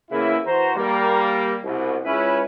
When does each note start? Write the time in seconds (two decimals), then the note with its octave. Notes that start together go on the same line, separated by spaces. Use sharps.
0.10 E2 C#3 E3 A#3 E4
0.46 E3 F#4 C5 A#5
0.76 G3 A#3
1.63 C2 B2
2.04 C#2 C#4 E4 B4